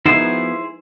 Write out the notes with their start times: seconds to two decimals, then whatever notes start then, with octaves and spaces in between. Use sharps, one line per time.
0.06 F3 B3 D#4 E4 F#4 G#4 C5